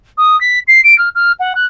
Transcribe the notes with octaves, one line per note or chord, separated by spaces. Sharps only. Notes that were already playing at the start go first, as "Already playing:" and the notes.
D#6
B6
C7
D7
F6
F6
F#5
F#6